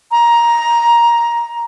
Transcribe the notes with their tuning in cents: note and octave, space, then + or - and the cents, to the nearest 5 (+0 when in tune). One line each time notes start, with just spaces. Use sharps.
A#5 +10